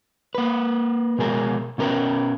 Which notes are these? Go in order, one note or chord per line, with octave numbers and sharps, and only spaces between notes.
A#3 B4
B2 G#3 G#4 A#4
B2 C#4 A#4 B4 G5